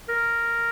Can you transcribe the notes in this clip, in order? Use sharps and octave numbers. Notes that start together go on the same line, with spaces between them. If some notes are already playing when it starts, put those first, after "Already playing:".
A#4